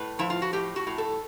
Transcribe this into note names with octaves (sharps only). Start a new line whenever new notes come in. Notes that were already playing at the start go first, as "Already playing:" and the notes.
Already playing: A2 B4
F3 E4
F4
F#4
A2 G4
F#4
A2
A4